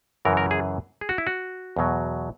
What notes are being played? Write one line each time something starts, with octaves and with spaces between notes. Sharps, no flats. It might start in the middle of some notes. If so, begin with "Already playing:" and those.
F#2 C#3 E3 A#4
A#4
G#4
G#4
F#4
E4
F#4
E2 B2 F#3